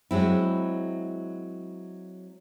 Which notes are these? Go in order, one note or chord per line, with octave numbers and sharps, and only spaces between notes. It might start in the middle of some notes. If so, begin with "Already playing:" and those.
F#3 G#3 C4 E4